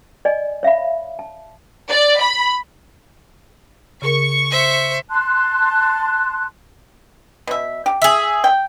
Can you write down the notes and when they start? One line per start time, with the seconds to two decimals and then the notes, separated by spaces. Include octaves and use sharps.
0.25 D5 D#5 G#5
0.63 C#5 E5 F5 B5
1.19 A5
1.89 D5
2.20 B5
4.02 C#3 G#4 A#4 C#6
4.50 C5 E5
5.09 A5 C6 F#6
7.47 B2 E5
7.86 G4
8.02 G#4 E5
8.44 G5